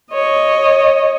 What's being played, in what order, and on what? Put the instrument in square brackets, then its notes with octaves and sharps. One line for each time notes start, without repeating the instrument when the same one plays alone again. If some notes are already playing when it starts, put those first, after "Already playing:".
[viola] C#5 D#5